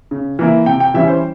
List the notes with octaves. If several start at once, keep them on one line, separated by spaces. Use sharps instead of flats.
C#3
E3 A#3 E4
C3 G5
G5
E3 G3 C#4 E4 E5
C5